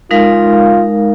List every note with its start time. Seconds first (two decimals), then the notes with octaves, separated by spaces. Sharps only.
0.11 G#3 D#4 F4 A#4 F5